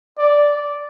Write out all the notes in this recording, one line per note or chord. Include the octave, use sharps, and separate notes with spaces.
D5